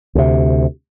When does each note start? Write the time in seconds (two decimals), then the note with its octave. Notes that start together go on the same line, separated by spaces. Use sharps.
0.15 D2 C3